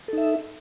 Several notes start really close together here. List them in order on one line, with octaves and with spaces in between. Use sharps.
A4 D#4 E5